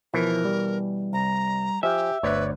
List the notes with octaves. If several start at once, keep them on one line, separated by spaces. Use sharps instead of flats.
B2 E3 F3 E4 A#4
G3
C2 A#5
F3 G4 E5 G#5
G1 D2 B4 C#5 D5